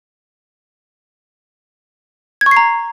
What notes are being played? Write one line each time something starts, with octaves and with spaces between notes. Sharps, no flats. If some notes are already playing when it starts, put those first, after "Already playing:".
G#6
C#6
C7
A#5